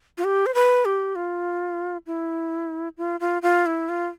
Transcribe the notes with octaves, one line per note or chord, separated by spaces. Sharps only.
F4
G4
C5
B4
G4
F4
E4
F4
F4
F4
E4
F4